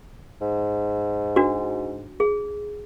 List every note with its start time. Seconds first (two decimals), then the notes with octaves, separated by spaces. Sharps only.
0.41 G#2
1.36 D4 F#4
2.20 G#4